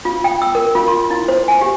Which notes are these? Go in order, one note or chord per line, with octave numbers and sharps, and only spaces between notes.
F4
G5
E6
A#4
F4
C6
E4
C5
G#5
G4